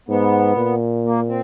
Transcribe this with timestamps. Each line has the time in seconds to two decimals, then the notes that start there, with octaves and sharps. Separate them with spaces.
0.09 G#2 B3
0.56 A#2
1.04 A#3
1.27 C4